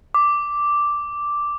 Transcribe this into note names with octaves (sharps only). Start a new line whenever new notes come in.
D6